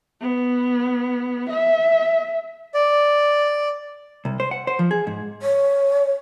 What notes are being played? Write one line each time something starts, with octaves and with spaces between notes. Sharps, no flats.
B3
E5
D5
C2
C5
F#5
C5
F3
G#4
G#2
C#5